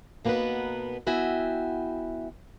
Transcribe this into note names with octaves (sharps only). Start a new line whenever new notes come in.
B2 A#3 B3 C#4 D#4 B4
B3 E4 F#4 E5 G5 G#5